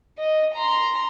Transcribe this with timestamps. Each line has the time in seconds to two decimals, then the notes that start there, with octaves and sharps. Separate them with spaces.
0.18 D#5
0.54 A#5 C6